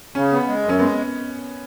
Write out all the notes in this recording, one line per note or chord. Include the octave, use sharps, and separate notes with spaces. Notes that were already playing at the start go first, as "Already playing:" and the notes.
C#3 C#4
B3
G#3
F#2
C#4
G#3 B3